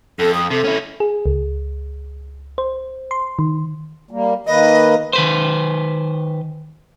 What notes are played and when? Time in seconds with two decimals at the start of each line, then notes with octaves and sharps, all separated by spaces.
0.19 F2 A4
0.34 D#6
0.50 C3 A4
0.64 C#4 E4
1.00 G#4
1.26 C#2
2.58 C5
3.11 C6
3.39 D#3
4.11 G3 A#3
4.47 D#3 A#3 B4 D#5
5.13 D#3 B4 C5